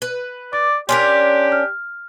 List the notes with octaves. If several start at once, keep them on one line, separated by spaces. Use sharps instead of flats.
B4
D5 D6
C#4 D4 G4 A#4 C6 G6 B6
F6